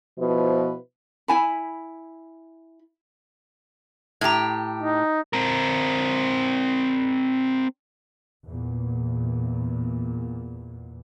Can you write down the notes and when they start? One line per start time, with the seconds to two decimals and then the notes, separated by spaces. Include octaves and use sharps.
0.19 B2 F3 E4 F4 B4 C5
1.28 E4 G#5 B5
4.21 A2 G4 A#5 G#6
4.83 D#4
5.33 C4 A#4
8.45 E2 A#2